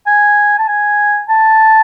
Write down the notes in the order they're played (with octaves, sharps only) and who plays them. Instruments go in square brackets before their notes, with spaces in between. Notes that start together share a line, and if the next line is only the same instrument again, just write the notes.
[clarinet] G#5
A5
G#5
A5